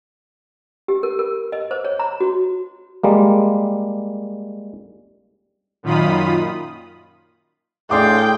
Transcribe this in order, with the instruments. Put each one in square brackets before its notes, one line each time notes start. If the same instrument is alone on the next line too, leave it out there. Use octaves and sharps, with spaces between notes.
[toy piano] G4
A#4
A#4
D#5
C5
C#5
A#5
F#4
[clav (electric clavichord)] G3 G#3 A#3
[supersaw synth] F#2 A#2 D#3 F4 B5 D#6
[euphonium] A2 [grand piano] D4 C6 D6 [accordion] G#4 F5 [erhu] G5